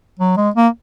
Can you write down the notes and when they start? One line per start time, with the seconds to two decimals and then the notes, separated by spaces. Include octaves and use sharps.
0.19 F#3
0.37 G#3
0.55 A#3